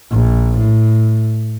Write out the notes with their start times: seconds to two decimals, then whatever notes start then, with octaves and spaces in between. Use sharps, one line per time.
0.11 A#1
0.58 A2